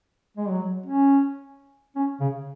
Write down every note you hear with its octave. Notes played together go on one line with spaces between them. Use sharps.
G#3
F#3
C#4
C#4
C#3